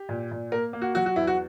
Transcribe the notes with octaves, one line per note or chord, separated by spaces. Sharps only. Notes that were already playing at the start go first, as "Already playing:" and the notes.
Already playing: G4
A#2
A#2
A#3 A#4
A#3
F#4
F#3 F#4
F#4
E2 E4
F#4